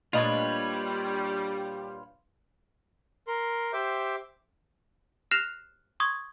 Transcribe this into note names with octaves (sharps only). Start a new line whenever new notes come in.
A#2 G3 D4 F4 B4 C#5 D#5
A#4 C6
G4 C5 E5 D6 G6
F6 F#6 A#6 C7 E7 F7
C6 C#6 D#6 G#6